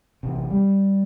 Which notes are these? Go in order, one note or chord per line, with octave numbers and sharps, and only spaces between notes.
A1 C3
G3